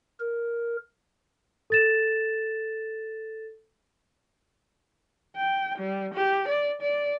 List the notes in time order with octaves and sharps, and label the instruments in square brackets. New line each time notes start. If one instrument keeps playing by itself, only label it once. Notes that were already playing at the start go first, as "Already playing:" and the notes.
[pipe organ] A#4
[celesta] A4 A6 E7
[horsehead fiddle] G5
G3
G4
D5
D5